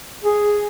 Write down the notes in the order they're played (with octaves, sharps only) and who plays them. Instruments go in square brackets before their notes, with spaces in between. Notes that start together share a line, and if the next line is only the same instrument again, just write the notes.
[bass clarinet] G#4